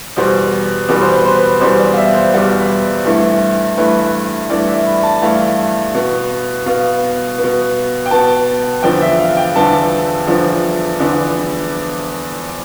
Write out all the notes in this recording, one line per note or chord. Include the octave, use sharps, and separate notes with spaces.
E2 B2 G3 B3 C5
E2 B2 G3 B3 B4
C5
B4
C5
B4
E2 B2 G3 B3 C5
D5
F5
E5
C5
E2 B2 G3 B3
G2 E3 A3
G2 E3 A3 B4
G2 E3 A3 D5
E5
B5
A5
G2 E3 A3 F5
B2 B3
B2 B3 F5
B3
B2
G5
B2 B3 A5
E2 D3 F3 B3 G5
E5
F5
G5
E2 D3 F3 B3 A5
E2 D3 F3 B3
E2 D3 F3 B3